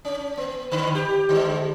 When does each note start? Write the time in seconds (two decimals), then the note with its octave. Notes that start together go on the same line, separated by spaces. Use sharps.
0.05 C#4
0.37 B3
0.71 D3 B4
0.95 G4
1.29 D3 G#3